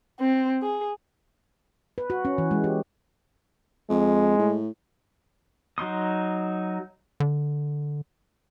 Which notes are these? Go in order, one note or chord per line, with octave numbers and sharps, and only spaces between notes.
C4
G#4
B4
F#4
C#4
E3
G#3
G4
F2 G#3
A2
F#3 D#4 C6 D#6
D3